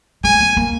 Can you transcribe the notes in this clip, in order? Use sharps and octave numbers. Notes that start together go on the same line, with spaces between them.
G#3 G#5
A#3
A#3